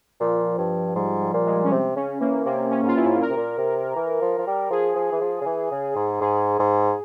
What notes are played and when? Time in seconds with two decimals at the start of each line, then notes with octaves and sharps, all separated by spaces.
0.20 A#2 F3
0.58 G2
0.95 G#2 G3
1.21 G3
1.34 A#2
1.46 G#3
1.64 C#4
1.71 C3 C4
1.96 C#3 C#4
2.20 E3 A#3
2.45 C3 A#3
2.71 C#4
2.83 G#2 F4
2.95 G2 E4
3.05 G#2
3.21 A#2 A#4
3.30 C3
3.36 A#2
3.58 C3
3.96 E3
4.22 F3
4.38 F3
4.47 G3
4.70 F3 G#4
4.95 F3
5.12 E3
5.21 F3
5.41 C#3
5.46 E3
5.71 C#3
5.96 G#2
6.21 G#2 G#4
6.59 G#2